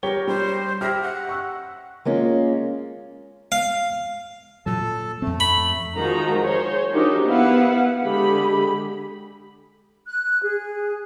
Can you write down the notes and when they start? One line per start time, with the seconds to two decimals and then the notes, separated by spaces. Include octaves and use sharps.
0.03 G3 G4 A#4 C#5 G7
0.28 G3 C5
0.81 G4 E5 F6 A#6
1.02 F#5
1.29 C#6 E6 F#6
2.05 G#3 A#3 C#4 F4
3.52 F5
4.66 A#2 F#3 A4 A5
5.22 F2 A3 C4
5.40 B5
5.96 D#3 F3 G#3 D#4 F#4 A#5
6.41 G#4 C5 C#5
6.91 F3 D4 D#4 F#4 G4 A#4
7.25 B3 E4 B4 F5 F#5
8.02 D3 G#3 G4 B5
10.07 F#6
10.43 G#4